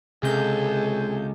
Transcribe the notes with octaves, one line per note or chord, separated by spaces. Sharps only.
C#2 C3 G#4 A4 G6